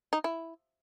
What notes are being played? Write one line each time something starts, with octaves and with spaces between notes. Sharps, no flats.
D#4
E4